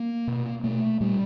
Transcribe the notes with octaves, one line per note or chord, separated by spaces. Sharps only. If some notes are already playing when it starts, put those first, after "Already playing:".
Already playing: A#3
B2
B2 A3
A#2 G3